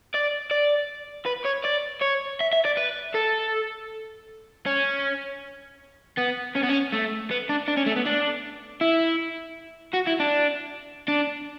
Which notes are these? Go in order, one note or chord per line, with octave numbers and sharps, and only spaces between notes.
D5
D5
B4
C#5
D5
C#5
E5
E5
D5
B4
A4
C#4
B3
C#4
B3
C#4
A3
B3
D4
D4
C#4
A3
B3
D4
E4
F#4
E4
D4
D4